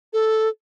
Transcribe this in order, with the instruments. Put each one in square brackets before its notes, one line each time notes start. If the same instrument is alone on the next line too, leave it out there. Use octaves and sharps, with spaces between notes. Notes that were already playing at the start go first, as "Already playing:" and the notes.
[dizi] A4